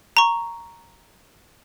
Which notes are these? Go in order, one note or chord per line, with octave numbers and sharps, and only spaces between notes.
A#5 C#6